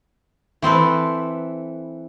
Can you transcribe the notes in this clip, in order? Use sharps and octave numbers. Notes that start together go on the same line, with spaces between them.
E3 C4 A4 B4